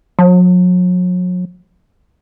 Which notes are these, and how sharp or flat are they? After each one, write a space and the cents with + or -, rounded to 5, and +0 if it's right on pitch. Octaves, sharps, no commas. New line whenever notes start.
F#3 -40